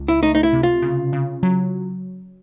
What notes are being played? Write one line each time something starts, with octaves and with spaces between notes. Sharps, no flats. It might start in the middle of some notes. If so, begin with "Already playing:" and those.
Already playing: C#2
E4
A3 D#4
D#4
E4
C3
F4
C#3
C#3
F#3